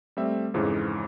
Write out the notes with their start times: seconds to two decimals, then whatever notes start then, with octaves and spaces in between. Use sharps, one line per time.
0.17 G3 A3 C4 E5
0.54 F2 G#2 C#3 E3 F3